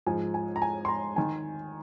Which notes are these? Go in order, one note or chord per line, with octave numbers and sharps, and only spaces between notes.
G#2 F3 G#3 G#5
G#5
A#5
G#5
C6
A#5
D#3 G#5